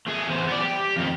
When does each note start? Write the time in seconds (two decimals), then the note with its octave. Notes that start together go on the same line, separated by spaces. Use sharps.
0.07 A3 G#4
0.28 E2 C5
0.47 B3 D5
0.61 G4
0.97 F2 D#3